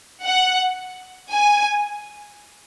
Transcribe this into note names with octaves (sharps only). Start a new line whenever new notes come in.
F#5
G#5